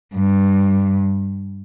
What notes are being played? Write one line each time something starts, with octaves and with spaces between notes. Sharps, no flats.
G2